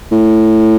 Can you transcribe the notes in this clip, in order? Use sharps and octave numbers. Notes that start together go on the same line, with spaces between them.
A2